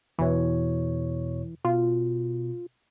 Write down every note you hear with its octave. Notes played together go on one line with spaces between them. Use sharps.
E2 B2 E3 C#5
B2 F4